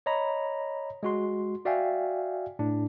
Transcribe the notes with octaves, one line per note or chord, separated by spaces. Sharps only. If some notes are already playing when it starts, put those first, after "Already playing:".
C#5 D#5 A#5 B5
G#3 F#4 C6
F#4 D5 E5 F5 G5 G#5
A2 D4